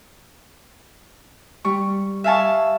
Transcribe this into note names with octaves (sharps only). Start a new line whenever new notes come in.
G3 C#6
E5 F5 G#5 A5 C#6